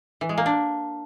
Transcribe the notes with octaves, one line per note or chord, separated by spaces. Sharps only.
E3
G#3
A#3
D4